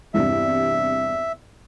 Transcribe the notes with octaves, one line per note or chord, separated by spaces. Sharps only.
E2 G2 C3 E5